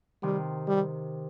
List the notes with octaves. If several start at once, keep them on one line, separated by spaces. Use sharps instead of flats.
C3 D#3 G3
G3